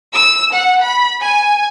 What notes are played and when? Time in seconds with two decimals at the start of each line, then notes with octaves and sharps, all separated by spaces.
0.13 E6
0.53 F#5
0.82 B5
1.21 G#5